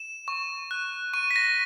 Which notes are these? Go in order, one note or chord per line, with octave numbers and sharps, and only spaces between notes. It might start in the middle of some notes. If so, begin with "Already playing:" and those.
Already playing: E7
C#6
F#6
C#6 D#7
B6
A#6